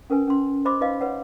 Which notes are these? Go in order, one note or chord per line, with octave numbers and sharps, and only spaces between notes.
C#4 A#4 B4 G#5
C#4 C6
C5 D#5 B5 C6 D6
D#4 F4 B4 D#5 F5
D#4 B4 C#5 F#5